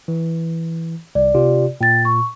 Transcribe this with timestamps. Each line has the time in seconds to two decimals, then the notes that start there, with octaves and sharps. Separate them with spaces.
0.08 E3
1.15 C2 D5
1.34 C3 F4 G4
1.81 A#2 G5 A6
2.05 C#6